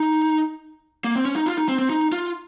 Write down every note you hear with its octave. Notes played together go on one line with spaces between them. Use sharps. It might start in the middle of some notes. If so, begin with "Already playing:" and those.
Already playing: D#4
A#3
C4
C#4
D#4
F4
D#4
C4
C4
D#4
F4